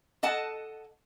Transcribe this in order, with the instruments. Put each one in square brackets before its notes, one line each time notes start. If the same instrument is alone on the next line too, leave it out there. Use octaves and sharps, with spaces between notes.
[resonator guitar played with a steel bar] A4 D#5 F#5 A5